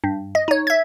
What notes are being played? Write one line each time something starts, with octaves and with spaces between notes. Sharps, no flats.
G2
D#5
D#4 C#5
E5 G#6